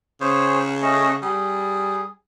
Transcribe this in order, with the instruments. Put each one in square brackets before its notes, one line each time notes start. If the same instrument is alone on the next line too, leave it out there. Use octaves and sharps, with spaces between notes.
[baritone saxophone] C#3 [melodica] G#4 C5 C#5
[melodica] A3 C#4 D#5
[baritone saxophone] G3 [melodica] G#4